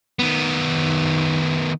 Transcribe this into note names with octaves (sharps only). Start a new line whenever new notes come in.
D#3 B3